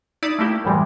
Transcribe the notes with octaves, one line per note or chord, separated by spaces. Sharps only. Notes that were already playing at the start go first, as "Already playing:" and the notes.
D#4 E4 D5 D#6
A3 A#3 E4 G4
F#2 A2 E3 G3 G#3